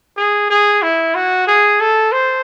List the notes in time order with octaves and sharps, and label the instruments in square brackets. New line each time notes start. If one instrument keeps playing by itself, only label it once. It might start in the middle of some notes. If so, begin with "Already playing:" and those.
[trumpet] G#4
G#4
E4
F#4
G#4
A4
C5